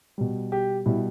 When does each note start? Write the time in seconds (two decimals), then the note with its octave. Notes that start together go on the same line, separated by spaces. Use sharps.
0.18 B2 G3
0.52 G4
0.86 B2 G3 E4